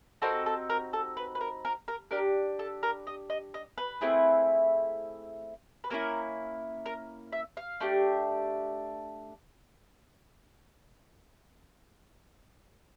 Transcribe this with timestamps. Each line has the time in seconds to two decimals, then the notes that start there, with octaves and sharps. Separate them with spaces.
0.22 C4 D#4 F#4 A4 A#4
0.46 A4
0.70 A#4
0.93 A4
1.17 B4
1.35 B4
1.41 A#4
1.65 A#4
1.88 A#4
2.11 D4 G4 A#4
2.59 A4
2.83 A#4
3.07 D#5
3.30 D#5
3.54 D#5
3.78 B4
4.01 A3 C4 E4 G#4
5.84 B4
5.90 A#3 C#4 E4 A#4
6.86 A#4
7.33 E5
7.57 F5
7.80 A3 D4 G4